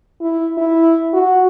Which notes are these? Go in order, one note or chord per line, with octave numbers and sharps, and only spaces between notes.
E4
E4
F#4